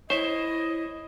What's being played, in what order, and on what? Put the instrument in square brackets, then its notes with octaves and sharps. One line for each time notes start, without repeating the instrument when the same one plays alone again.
[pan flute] E4 [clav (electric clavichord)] C5 E5 [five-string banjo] C#5 [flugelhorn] D#5